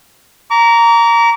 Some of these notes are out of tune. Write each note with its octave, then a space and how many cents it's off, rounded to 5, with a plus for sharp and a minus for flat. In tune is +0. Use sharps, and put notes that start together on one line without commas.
A#5 +0 D6 -40